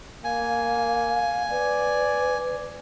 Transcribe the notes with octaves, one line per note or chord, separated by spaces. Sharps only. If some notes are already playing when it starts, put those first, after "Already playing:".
A#3 F5 G#5
B4 D5